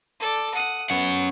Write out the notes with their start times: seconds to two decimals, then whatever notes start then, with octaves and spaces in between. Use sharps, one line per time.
0.20 A4 D5
0.54 F#5 D#6
0.90 B3 C#4 F#5